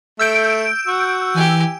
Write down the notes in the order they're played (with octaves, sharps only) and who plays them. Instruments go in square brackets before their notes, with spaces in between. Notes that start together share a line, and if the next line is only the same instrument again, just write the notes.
[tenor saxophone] A3 [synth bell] E6 G6 D7
[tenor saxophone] F#4
[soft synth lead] E3 [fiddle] G4 G#5